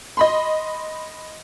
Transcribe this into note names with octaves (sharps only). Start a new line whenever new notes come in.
D#5 B5 C6